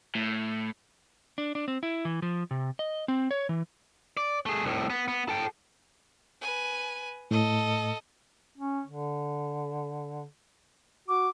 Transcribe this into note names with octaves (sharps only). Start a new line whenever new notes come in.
A2
D4
D4
C4
E4
E3
F3
C3
D#5
C4
C#5
E3
D5
A3 G#4
C2 A2
B3
B3
A4 G5
B4 G#5
A2 A4 D#5
C#4
D3
F#4 D6